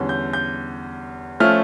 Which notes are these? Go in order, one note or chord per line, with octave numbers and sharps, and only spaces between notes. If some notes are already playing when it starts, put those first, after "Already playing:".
Already playing: E2 D3 G3 C#4
G6
G6
F3 A3 C#4 F6